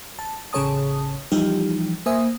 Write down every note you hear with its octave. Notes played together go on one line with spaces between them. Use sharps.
A5
A1 C#3 G#4 C#5 A5 D#6
E3 F3 G3 D#4 G4
A#3 C5 E5 G#5 D#6